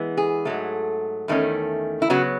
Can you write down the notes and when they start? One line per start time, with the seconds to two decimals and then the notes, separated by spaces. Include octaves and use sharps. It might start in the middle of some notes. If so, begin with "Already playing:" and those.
Already playing: E3 G#3 B3
0.17 G#4
0.45 G#2 F#3 A3
1.28 E2 D#3 A3 C#4
2.02 E4
2.10 C#3 F#3 B3 F#4